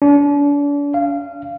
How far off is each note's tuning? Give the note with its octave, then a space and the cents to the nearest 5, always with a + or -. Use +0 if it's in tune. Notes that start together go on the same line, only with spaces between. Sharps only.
D4 -40
F5 -20